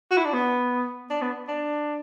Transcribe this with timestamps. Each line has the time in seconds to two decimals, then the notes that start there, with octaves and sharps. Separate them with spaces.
0.11 F#4
0.18 E4
0.25 D4
0.33 B3
1.10 D4
1.22 B3
1.48 D4